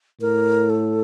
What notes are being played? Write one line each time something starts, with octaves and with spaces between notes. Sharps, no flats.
A2 A#4
A4